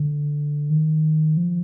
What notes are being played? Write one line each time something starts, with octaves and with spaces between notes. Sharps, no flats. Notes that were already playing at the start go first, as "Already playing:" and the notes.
Already playing: D3
D#3
F3